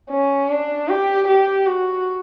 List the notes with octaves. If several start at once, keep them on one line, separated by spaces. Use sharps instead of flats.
C#4
D4
G4
G4
F#4